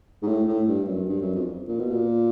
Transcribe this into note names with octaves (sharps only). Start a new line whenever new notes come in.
G#2
A2
A2
G2
F#2
G2
F#2
F2
A#2
B2
A#2